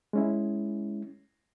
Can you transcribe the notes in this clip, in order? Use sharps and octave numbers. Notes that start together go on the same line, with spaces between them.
G#3 C#4 E4